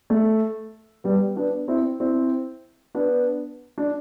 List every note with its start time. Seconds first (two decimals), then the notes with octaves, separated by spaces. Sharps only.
0.10 A3
1.04 G3 B3
1.36 B3 D4
1.68 C4 E4
2.00 C4 E4
2.95 B3 D4
3.78 D4